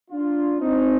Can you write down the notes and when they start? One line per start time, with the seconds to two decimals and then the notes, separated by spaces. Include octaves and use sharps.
0.11 D4 F4
0.60 C4 D#4